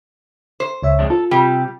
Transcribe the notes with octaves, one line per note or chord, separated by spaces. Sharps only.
C5
C#2 C#5 E5
F2 G#3 D4
F4 A4
C3 G3 G4